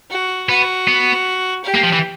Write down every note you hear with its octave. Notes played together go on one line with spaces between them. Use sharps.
F#4
B3 F#4
B3
G4
A#3
F3
E3